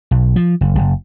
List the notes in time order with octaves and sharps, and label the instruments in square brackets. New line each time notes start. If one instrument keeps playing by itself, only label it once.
[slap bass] B1
F3
F#1
F#1